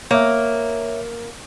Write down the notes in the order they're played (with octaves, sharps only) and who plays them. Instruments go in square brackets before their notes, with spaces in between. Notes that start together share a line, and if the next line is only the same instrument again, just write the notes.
[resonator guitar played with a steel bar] A#3 [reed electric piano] C#5 E5